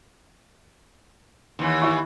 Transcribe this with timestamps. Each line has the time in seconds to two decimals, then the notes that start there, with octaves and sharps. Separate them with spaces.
1.59 D#2 E3
1.82 E4 C#6